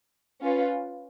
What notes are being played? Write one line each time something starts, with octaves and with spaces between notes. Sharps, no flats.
C#4 F4 B4